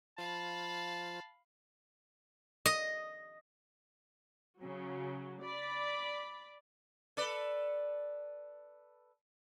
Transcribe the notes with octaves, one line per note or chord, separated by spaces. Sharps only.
F3 F4 C5 F5 A5 B5
D#5
C#3 F#3
D5 B5
A4 B4 D5